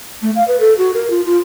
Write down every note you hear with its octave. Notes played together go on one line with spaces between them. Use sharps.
A3
F5
B4
A4
F#4
A#4
F4
F4